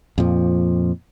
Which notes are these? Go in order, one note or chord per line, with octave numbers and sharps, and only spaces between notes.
F2 A#2 F3